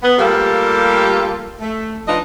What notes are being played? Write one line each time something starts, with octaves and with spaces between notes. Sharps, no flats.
B3
G3 A3 A#3 F4 G4 A4
A3
F3 D4 D#4 F4 B4 D#5